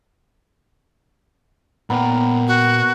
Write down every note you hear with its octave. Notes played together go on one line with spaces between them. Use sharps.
A#2 B3 A#4 G5
F#4